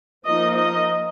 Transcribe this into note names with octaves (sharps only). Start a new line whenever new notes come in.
F3 A#3 D#4 D#5
D#5